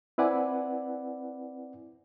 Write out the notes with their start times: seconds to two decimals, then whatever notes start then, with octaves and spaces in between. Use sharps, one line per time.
0.18 C4 E4 B4 D5 F#5 G#5